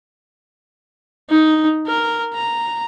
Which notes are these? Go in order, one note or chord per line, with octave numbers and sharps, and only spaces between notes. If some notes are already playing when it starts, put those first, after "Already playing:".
D#4
A#4
A#5